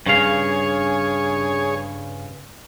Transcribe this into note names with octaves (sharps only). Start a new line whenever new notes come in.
G2 C#3 G#4 C#5 F5